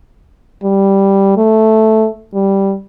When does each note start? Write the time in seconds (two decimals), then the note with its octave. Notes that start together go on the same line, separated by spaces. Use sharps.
0.63 G3
1.37 A3
2.34 G3